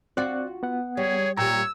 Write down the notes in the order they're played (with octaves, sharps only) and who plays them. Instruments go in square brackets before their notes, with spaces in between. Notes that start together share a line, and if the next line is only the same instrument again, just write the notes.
[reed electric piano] C4 D5 F#6 [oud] F4 F#4
[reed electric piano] B3 F#5
[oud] G3 [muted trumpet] G#4 [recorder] C#5
[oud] A#2 G3 [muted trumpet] C#5 [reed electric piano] G5 A#5 [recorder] E6